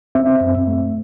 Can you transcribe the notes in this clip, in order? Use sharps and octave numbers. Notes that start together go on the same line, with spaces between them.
C4 E5
F#2
A3